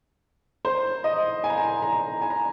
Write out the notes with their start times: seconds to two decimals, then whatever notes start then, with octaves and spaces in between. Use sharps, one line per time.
0.65 C5
1.04 D#5
1.44 G#5
1.50 A#5
1.58 G#5
1.82 A#5
2.22 G#5
2.30 A#5